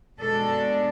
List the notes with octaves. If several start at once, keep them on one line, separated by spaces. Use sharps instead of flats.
B2 G#3 D4 A4